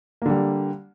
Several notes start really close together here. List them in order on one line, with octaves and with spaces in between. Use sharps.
A#3 D3 G3